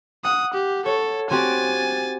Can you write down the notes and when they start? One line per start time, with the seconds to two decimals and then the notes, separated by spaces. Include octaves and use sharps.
0.25 F#5 D#6
0.54 G4
0.86 A4 C#5
1.31 C4 F#4 G4 G#5 A6